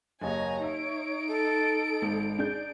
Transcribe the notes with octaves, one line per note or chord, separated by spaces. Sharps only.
F#1 D#2 C#5 D#5 G#5 A#5
D#4 E5 D7
A4
G#1
D4 G#4 G6